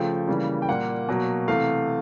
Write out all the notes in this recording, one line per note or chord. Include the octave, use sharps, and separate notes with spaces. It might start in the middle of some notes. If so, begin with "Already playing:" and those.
Already playing: C#3 F3 A3 G5
C#3 E3 G3 A#3
G5
A#2 G3 A#3 F#5
B2 F#3 A#3
C3 E3 A3 F5